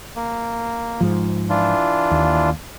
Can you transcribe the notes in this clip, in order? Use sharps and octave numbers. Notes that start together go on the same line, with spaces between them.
A#3
G#2 F3
E3 D4 F4
D#2